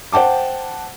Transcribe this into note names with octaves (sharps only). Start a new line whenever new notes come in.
C5 F#5 G5 A5 D6